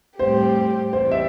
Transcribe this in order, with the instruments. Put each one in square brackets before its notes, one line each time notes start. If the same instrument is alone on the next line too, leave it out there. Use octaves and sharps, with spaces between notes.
[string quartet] A2 G3 C4 G4 [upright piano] C5
[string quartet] E3 G3 C4 [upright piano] C5
[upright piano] E5